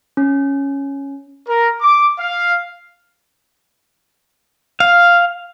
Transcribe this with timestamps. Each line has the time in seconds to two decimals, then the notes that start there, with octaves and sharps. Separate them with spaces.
0.17 C#4
1.47 A#4
1.81 D6
2.19 F5
4.80 F5